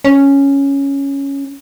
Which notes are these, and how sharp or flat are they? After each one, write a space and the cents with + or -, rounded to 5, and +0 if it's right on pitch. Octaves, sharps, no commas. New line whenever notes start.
C#4 +0